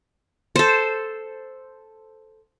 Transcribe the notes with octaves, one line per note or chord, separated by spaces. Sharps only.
A4 C5